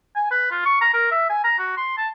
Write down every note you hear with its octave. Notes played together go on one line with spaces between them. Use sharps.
G#5
B4
F4
C#6
A#5
A#4
E5
G#5
A#5
F#4
C6
A5